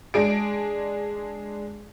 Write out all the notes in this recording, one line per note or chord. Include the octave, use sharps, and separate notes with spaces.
G#3 D4 G#4 D7